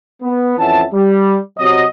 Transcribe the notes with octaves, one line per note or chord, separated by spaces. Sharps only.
B3
F2 E3 C#4 E5 F#5 A5
G3
C3 F#3 D#5